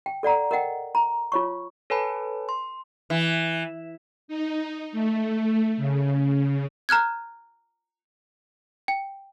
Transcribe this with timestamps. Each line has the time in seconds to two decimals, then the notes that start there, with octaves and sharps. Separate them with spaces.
0.06 G5
0.23 A4 D5 F#5 A#5
0.51 A#4 D#5 F#5 G5
0.95 A#5
1.32 F4 C#5 C#6
1.90 A4 B4 C#5 G#5 A5 B5
2.49 C6
3.10 E3
4.28 D#4
4.92 A3
5.77 C#3
6.89 A#5 F6 F#6 G#6
8.88 G5